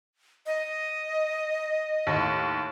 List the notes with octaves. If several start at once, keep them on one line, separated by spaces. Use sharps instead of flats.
D#5
D#2 A2